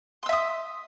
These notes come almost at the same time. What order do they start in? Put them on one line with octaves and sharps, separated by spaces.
C6 E6 E5 D#6